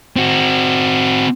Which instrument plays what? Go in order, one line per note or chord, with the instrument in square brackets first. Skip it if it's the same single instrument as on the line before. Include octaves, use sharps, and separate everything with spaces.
[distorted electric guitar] C4 F#4